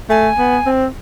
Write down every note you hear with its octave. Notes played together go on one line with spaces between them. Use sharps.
A3 G#5
B3
C4